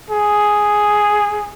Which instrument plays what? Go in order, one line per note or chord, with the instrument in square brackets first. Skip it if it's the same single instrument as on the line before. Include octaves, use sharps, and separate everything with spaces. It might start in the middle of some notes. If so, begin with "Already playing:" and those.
[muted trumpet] G#4